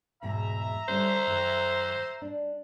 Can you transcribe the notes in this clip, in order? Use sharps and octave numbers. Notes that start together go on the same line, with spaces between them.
E2 G#2 B2 E5 A#5
D3 G3 C#4 C5
F#2 D#3
D4